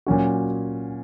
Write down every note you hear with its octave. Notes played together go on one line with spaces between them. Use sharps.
A#2 F#3 C#4 F#4